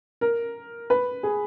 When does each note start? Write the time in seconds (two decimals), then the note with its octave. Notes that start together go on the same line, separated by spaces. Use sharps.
0.21 A#4
0.90 B4
1.23 G#4